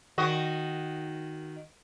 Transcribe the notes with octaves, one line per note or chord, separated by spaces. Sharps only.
D#3 F#4 D#5